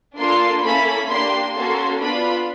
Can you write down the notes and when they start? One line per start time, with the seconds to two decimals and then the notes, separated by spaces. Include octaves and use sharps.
0.17 A#3 D4 F4 A4 C6
0.63 A#3 C#4 E4 A4 B5
1.08 A#3 D4 G4 C6
1.54 A#3 C#4 F#4 A4 C6
1.99 B3 D4 F4 B5